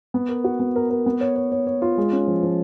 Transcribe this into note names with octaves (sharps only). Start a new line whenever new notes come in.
B3
A#4
F#4
B3
A#4
A#4
B3
C#5
C#5
C#5
C#5
F4
G#3
C#4
F3
F3